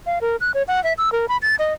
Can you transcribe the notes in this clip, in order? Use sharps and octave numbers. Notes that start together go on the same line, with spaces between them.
F5
A#4
F#6
C#5
F#5
E5
E6
A#4
B5
A6
D#5